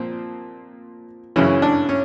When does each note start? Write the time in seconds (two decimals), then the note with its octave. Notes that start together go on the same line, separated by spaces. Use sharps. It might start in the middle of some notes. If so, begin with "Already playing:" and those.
Already playing: A#2 F3 C4
1.36 F#2 C#3 E3 C#4
1.62 D4
1.89 C#4